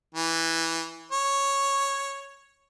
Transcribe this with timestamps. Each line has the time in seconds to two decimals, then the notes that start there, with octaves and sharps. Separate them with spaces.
0.14 E3
1.12 C#5